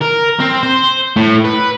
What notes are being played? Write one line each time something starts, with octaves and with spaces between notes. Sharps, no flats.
A#4
C4
C5
A2
B4